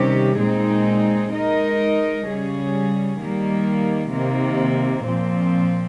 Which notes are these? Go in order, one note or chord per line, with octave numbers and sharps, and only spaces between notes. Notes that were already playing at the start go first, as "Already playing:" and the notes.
Already playing: C3 D#3 G3 C#4 G4
A#2 G#3 C4 D#4 G#4
G#3 D#4 A#4 D#5
C#3 G3 C#4 G#4
D#3 G3 A#3
C3 D#3 A#3
A#2 F3 C4